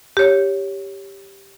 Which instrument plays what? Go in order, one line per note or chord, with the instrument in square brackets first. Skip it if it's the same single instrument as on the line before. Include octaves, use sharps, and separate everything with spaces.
[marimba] G4 C#5